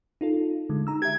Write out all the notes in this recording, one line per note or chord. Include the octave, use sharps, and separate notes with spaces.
D#4 F4 A4
D3 G#3
D#4 A#5 E6
G4 E5 G#6